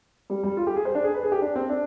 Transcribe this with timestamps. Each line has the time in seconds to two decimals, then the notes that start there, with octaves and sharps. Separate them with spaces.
0.30 G3
0.43 G3
0.57 F4
0.67 G4
0.76 G#4
0.85 C5
0.95 D4
1.04 G#4
1.14 B4
1.23 G#4
1.32 G4
1.42 D4
1.56 C4
1.69 D4